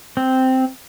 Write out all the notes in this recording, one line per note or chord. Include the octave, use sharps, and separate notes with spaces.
C4